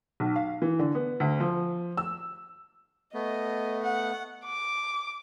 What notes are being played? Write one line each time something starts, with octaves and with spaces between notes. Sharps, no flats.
B1
F5
E3
D3
B3
D2
F3
E6
A3 B3 D#5
F#5
D6